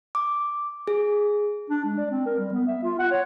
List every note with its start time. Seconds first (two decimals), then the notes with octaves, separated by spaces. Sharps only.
0.15 D6
0.88 G#4
1.70 D4
1.85 G#3
1.98 D5
2.11 C4
2.26 A#4
2.39 G3
2.53 B3
2.67 E5
2.83 F4
2.99 F#5
3.11 C#5